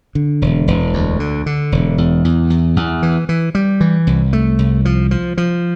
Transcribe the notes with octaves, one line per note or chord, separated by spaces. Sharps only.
D3
E1
E1
D2
D3
D3
E1
E2
E2
E2
E2
E3
E3
G3
E3
C2
A3
C2
F3
F3
F3